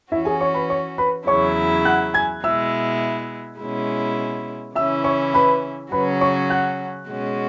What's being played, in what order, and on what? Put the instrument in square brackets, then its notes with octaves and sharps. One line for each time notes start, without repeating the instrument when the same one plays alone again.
[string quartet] E3 C#4 F#4 [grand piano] E4 E5
[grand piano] G#4 G#5
C#5 C#6
B4 B5
C#5 C#6
B4 B5
[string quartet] E2 C#3 F#3 E4 [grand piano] C#5 C#6
[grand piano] F#5 F#6
G#5 G#6
[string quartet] B2 G#3 E4 [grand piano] E5 E6
[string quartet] B2 G#3 C#4 E4
[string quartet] C#3 E3 C#4 E4 [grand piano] E5 E6
[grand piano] C#5 C#6
B4 B5
[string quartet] C#3 F#3 C#4 F#4 [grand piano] B4 B5
[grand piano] C#5 C#6
F#5 F#6
[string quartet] B2 G#3 C#4 F#4